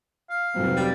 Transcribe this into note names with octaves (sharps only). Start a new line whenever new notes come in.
F5
F1 F#3 C4
G3